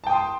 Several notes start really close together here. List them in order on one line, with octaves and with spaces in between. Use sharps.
A5 G5 D#6 C6